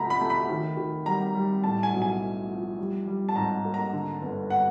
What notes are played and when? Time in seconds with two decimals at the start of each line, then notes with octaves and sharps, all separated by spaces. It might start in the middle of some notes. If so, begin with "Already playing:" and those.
Already playing: C#2 F3 A3 A#5 B5
0.10 B5
0.21 A3
0.30 B5
0.49 D#3
0.77 D#3
1.06 G3 A#5
1.35 G3
1.64 A2 A5
1.83 G#5
1.93 B1
2.02 G#5
2.22 A3
2.50 F3
2.79 G3
3.08 G3
3.29 A5
3.36 G#2 A#5
3.65 A#3
3.74 A#5
3.93 D3
4.21 G1
4.50 F#5